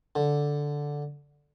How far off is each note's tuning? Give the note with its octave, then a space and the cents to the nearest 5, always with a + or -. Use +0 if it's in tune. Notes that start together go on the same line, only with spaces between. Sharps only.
D3 -5